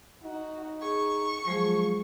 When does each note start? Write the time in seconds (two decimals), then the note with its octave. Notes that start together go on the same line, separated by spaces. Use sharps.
0.24 D#4 F#4
0.82 G#4 C#6
1.46 F3 F#3 G#3 G#4